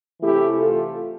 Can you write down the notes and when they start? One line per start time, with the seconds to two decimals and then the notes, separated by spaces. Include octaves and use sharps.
0.21 C3 E3 A3 C4 E4 G4
0.57 F4 A4